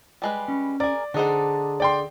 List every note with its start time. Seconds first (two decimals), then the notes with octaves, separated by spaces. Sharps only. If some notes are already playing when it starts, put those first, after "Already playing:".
0.22 G3 G#3 B4
0.48 C#4
0.80 G#4 A#4 D5
1.14 D3 D4 D#4 G#4 C5 F#5
1.80 D5 G5 C6